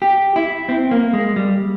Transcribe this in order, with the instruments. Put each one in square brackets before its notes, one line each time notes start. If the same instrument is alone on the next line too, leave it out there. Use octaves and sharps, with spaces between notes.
[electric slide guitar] G4
E4
C4
A#3
G#3
G3